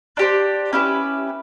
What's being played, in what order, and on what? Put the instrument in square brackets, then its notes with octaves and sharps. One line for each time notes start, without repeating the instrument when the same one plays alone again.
[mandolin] D4 G4 C5
C#4 E4 G4 B4